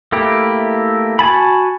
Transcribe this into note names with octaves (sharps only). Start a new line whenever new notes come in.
A3 A#3 E4 G4
F#4 G#5 A5 B5